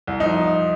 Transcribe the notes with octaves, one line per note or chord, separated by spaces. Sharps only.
C2
F3 D#4